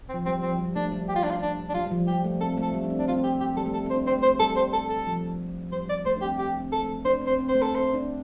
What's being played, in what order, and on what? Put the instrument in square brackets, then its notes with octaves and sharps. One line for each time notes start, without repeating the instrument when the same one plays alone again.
[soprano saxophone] C4
[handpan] F3
[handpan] G3 [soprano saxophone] C4
[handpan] F3 [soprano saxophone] C4
[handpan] G3
[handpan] A3 [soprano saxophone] D4
[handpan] G3
[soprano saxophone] G4
F4
D4
F4
D4
D4
[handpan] G3 [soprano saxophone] F4
[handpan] G3
F3
[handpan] G3 [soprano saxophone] G4
[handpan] A3
[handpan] C4 [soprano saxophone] A4
[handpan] A3
[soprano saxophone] A4
[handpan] G3
D4
C4
[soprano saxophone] D4
[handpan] C4 [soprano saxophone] F4
[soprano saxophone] G4
G4
[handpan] G3 [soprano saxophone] A4
[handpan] A3
[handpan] C4 [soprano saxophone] A4
[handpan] C4
[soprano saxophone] C5
[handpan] D4
[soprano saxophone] C5
[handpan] A3
[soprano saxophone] C5
[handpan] G3 [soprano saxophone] A4
[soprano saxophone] C5
A4
A4
[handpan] F3
[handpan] G3 [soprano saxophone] C5
[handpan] G3 [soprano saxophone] D5
[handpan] A3 [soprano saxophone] C5
[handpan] D4
[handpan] C4 [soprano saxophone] G4
[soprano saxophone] G4
[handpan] C4
[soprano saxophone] A4
[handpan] A3
[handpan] D4 [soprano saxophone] C5
[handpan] C4
[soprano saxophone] C5
[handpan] C4
[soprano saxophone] C5
[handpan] A3
[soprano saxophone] A4
[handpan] C4
[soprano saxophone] C5
[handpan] D4